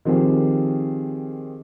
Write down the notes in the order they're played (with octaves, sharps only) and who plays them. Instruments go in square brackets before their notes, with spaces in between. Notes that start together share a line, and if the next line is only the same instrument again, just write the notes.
[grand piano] D#3 F3 C4 G4 G#4